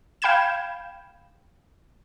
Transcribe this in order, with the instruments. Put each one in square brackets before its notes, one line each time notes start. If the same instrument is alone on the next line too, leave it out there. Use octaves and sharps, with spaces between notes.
[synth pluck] F5 G5 B5 G6 G#6 E7